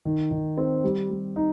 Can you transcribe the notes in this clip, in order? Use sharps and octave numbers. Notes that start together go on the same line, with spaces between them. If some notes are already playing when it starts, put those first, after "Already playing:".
D#3
D#3
C4
G3
G3
D#4